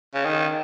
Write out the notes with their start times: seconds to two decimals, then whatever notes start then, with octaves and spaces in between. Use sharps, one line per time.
0.14 C#3
0.25 D#3